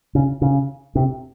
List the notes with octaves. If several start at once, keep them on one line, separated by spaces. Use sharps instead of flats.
C#3
C#3
C3